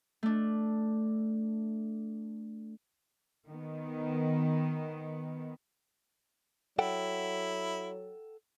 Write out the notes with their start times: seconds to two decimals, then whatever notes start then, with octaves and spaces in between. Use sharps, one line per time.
0.23 A3 D4
3.48 D#3 B3
6.79 F#3 E4 A4 F#5 G5